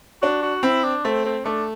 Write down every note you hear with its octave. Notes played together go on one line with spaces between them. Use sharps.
D4 F#4
F#4
C4 E4
D4
A3 C4
C4
A3 D4